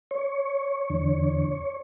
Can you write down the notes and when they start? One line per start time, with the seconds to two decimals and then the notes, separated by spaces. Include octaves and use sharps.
0.11 C#5
0.90 E2 D3